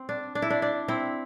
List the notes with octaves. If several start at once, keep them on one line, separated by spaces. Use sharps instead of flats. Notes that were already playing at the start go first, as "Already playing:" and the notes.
Already playing: C4
D4
D4
E4
D4
D4
C4 E4